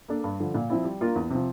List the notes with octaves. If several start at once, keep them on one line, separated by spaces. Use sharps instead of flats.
A#3 D4 A4 D5
G2
D3 F3
A#2
F3 C4 E4
G3
A#3 D4 F4 A#4
E2
C3 F3